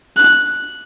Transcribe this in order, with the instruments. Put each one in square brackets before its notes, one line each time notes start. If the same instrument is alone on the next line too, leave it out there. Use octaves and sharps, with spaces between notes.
[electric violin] F#6